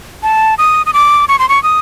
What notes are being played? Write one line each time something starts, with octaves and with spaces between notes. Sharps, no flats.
A5
D#6
D#6
D6
C#6
C6
C#6
D#6